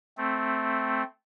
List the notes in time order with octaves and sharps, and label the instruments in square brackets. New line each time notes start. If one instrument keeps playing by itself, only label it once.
[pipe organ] A3 C4